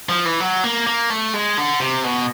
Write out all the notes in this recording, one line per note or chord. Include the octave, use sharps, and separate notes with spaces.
F3
E3
F#3
A#3
A#3
A3
G#3
D3
C3
B2